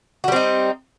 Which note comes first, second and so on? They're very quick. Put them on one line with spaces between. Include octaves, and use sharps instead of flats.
F#4 G3 C4 D#4